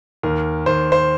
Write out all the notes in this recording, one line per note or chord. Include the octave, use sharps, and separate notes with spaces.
D#2 A#4
D#2 C5
C5